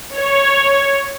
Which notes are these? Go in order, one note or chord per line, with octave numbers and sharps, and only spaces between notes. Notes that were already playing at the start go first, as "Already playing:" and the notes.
C#5